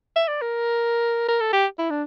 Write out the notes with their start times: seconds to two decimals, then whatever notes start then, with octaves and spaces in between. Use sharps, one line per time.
0.16 E5
0.28 D5
0.42 A#4
1.28 A#4
1.41 A4
1.53 G4
1.79 E4
1.90 D4